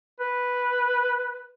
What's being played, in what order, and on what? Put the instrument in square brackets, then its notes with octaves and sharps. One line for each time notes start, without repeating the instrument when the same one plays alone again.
[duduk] B4